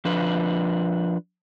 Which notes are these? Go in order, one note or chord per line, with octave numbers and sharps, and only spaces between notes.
F3 D4 B4